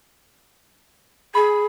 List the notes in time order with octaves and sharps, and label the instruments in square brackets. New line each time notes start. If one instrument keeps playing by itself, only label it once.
[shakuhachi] G#4 [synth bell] B5